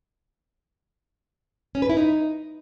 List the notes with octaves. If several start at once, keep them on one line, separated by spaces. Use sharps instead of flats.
C#4
B4
E4
D#4